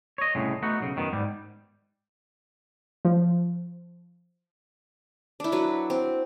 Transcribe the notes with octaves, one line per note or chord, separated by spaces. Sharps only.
C#5 D#5
C2 A2 C#3 G#3
A3 B3 D#4 F#4
B1 C#3
F#2 D#3 B3
G#2 G3
F3
D4 E4
F#3 F#4 B4
C4